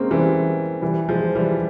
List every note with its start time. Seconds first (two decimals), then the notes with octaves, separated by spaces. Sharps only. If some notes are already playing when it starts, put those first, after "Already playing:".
Already playing: G#3 A#3 C4 C#4
0.11 E3 G3
0.82 E3 G3
1.08 F3 G#3
1.35 E3 G3